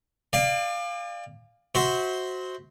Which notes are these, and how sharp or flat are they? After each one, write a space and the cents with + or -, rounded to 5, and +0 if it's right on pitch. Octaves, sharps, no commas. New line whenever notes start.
D5 +35 F5 +0 G#5 -40
F#4 +0 C5 +0 E5 -40